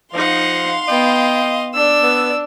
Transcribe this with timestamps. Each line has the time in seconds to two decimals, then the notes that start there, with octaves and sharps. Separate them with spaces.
0.14 F3 D#4 F5 F#5 C6
0.88 B3 D#5 G5
1.74 D4 D5 E6
2.03 B3